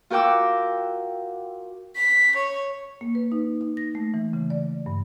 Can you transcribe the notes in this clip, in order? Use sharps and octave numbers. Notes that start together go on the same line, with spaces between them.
F4 F#4 A#4 G5 D6 E6
B6
C#5
A#3
B4
D#4
D#4
A#6
A3
E3
C#3
D5
G2